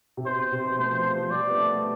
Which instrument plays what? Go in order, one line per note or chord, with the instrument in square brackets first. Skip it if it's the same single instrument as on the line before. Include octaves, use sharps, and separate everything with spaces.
[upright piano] C3
[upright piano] B2 [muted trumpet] C5
[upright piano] B2
C3
B2
[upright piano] A3 [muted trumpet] C5
[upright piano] F3
F3
F3
[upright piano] G3 [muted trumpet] D5
[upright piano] B3
A3
B3